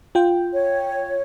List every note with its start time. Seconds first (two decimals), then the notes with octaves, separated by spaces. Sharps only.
0.15 F4 G5
0.52 C#5